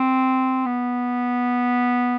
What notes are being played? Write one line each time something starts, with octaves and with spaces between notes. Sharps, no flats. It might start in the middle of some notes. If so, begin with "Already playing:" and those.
Already playing: C4
B3